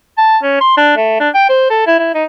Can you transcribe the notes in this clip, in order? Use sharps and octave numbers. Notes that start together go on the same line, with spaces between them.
A5
C#4
C6
D4
A3
D4
G5
C5
A4
E4
E4
D#4